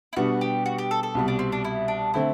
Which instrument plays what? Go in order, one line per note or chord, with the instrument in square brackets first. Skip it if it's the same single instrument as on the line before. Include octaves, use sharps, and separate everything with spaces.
[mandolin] E4
[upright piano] B2 G3 B3 D4 [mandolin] F#4
[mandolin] G4
F#4
G4
A4
A4
[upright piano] C2 B2 G3
[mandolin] D4
C4
D4
E4
D4
[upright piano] D3 A3 C4 [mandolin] E4